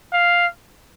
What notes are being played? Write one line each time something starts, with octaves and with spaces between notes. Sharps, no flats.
F5